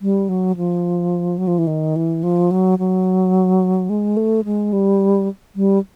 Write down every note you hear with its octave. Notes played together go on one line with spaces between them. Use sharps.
G3
F#3
F3
F#3
F3
E3
D#3
E3
F3
F#3
F#3
G#3
A3
G#3
G3
G3